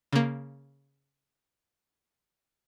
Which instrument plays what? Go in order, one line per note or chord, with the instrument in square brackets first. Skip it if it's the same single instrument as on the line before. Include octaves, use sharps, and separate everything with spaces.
[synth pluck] C#3 A#3